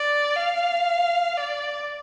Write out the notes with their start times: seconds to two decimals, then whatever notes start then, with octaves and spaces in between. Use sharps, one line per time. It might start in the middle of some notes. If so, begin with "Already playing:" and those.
Already playing: D5
0.36 F5
1.37 D5